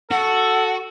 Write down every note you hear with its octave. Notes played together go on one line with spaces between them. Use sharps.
F#4 A4 F#5